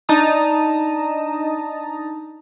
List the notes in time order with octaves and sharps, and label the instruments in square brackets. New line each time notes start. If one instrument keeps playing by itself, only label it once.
[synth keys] D4 D#4 A5 A#5 D#6